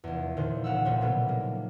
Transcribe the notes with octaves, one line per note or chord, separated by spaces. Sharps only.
F1 E2
D#2 A#2 D#3 C5
E1 C#2 F5 F#5 E6
D#1 A#1 C5 C#5
B2 D#3 F#3 G3 A3 B3
A#3